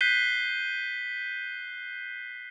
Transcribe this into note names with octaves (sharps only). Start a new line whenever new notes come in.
F#6 G6 B6 C7 D#7 G7